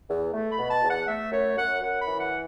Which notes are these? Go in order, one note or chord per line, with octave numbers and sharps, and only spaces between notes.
E2
A3
B5
B2
A5
E2
F#5
A3 E5
F#2 C#5
F#2 F#5
F#2 F#5
B5
E3
F#5